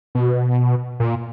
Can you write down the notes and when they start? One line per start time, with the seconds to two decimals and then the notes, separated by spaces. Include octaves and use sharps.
0.15 B2
1.00 A#2